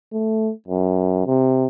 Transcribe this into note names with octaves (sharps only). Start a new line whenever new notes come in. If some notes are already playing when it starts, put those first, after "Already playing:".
A3
F#2
C3